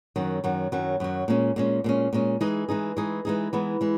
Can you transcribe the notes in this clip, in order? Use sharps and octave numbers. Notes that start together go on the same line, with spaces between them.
F#2 D#3 F#3
F#2 D#3 F#3
F#2 D#3 F#3
F#2 D#3 F#3
A#2 G#3 C#4
A#2 G#3 C#4
A#2 G#3 C#4
A#2 G#3 C#4
E3 G#3 D#4 G#4
E3 G#3 D#4 G#4
E3 G#3 D#4 G#4
E3 G#3 D#4 G#4
E3 G#3 B3 D#4
E3 G#3